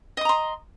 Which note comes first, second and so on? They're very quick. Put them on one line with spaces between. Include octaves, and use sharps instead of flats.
D#5 D#6 A#5 C6